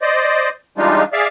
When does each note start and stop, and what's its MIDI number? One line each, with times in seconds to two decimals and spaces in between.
0.02 0.49 72
0.02 0.49 74
0.02 0.49 75
0.78 1.04 52
0.78 1.04 55
0.78 1.04 56
0.78 1.04 62
0.78 1.04 63
0.78 1.04 65
1.13 1.27 68
1.13 1.27 74
1.13 1.27 76
1.13 1.27 77